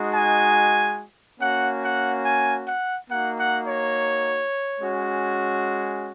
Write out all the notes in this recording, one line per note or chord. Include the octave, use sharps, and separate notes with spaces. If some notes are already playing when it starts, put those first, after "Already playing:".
Already playing: G#3 D#4 F#4
G#5
A#3 C#4 F#4 F#5
F#5
G#5
F#5
A#3 D#4 F#4 F#5
F#5
C#5
G#3 C#4 F#4